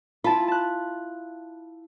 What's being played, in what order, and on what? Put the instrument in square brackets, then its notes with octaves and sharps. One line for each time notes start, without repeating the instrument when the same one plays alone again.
[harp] E4 A5 B5 [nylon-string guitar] F4
[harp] A5 F#6